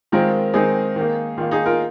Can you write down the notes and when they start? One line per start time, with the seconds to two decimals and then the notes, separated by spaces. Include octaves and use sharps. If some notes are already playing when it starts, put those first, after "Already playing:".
0.12 D#3 G#3 C4 F4 A#4
0.54 D#3 G#3 C4 D#4 G#4
0.96 D#3
1.01 A#3
1.37 D#3 A#3 F4
1.51 D#4 G#4
1.66 F4 A#4